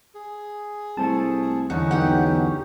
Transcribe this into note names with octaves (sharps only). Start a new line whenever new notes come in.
G#4
C2 A3 C5 A5
E2 D3 C#4 D#4 F#4
B1 G4 F#5